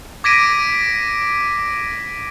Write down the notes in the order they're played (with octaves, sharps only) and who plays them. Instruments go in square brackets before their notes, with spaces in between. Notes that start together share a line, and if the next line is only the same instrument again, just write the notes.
[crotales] D6 G#6 A#6 B6 D7 D#7